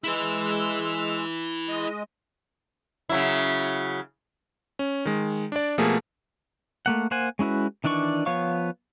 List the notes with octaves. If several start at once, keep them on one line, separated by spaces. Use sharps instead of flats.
G#3 E4 B4 E6
G#3 D#5
C#3 F#3 E4
C#4
D#3 G#3
D4 D5
B2 F3 A3 A#3 G#4
A3 A#3 F#5
A#3 C5 F#5 G#5
G#3 C#4 E4 F#4 B4
D#3 E3 D4 D5 C#6
F3 B3 C#5 F5 C#6